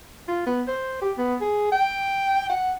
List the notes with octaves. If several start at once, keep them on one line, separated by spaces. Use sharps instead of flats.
F4
B3
C5
G4
B3
G#4
G5
F#5